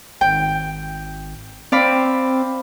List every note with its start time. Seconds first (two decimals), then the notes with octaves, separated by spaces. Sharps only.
0.21 G#1 G5
1.72 C4 D5 F5 B5